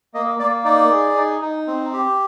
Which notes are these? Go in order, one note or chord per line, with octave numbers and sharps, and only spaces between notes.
A#3 D#5
A#3 D5
D#4 D5
G#4
D#4
D#4
C4
G4